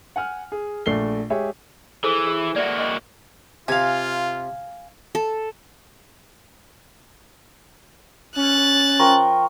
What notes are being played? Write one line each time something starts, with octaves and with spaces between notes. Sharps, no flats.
F#5 G#5 F6
G#4
A#1 A3 C7 G7
G#3 G4 G#4 C#5 E5
E3 G#4 A4 C5
G#4
A#3 F#4 D5 E5
D#5 G5 B5
C3 F4 F5 G#5
A4
C#4 F#6 A6
F3 A#4 G5 C#6